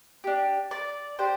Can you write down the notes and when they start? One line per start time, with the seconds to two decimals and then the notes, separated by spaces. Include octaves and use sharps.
0.24 D4 G4
0.71 D5
1.19 D4 G4 C5